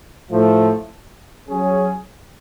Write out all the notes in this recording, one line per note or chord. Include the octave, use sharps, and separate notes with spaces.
A2 F3 A3
F#3 C#4 G#4